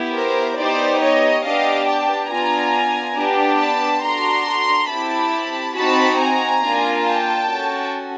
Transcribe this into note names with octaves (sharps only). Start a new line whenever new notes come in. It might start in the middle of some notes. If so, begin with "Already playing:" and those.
Already playing: B3 E4 G4
A#4 C5
B3 D#4 G4 C5 D5
C#5 D#5
B3 D4 G4 D#5 F5
G5 A5
B3 D4 F4 G#5 A#5
B3 D4 G4
A5 B5
D4 F#4 A4 A#5 C6
C4 E4 G4 A5 B5
C4 D#4 F#4 A5 B5
G#5 A#5
A#3 D4 F4
G5 A5
C#4 F#4 A4